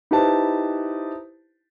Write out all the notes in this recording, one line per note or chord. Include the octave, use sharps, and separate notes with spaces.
D#4 E4 G4 B4 C5 A5